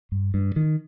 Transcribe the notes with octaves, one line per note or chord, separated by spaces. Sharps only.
G2
G2
D#3